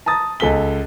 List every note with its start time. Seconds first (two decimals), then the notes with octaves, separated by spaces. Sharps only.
0.06 A5 A#5 D#6 A6
0.40 C#2 A4 G#5 B6 G7